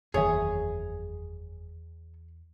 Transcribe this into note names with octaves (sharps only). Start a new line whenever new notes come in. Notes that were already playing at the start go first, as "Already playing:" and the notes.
F#1 E2 D#3 E3 G#4 C#5 E5